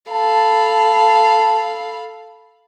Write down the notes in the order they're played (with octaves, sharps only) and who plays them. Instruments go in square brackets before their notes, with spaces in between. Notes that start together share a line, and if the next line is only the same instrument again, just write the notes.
[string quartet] A4 F5 B5 [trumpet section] A5